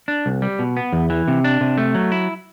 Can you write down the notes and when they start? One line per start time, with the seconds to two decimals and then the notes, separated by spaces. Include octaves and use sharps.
0.08 D4
0.26 C2
0.42 G3
0.59 B2
0.77 B3
0.93 E2
1.10 E3
1.28 C3
1.44 D4
1.61 C3
1.78 A3
1.94 F#3
2.12 E4